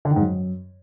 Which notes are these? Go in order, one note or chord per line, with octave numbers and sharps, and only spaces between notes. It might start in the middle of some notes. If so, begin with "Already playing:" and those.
D3
D#3
G#2
F#2